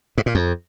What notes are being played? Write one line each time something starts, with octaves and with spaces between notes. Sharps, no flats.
G#2
A#2
F2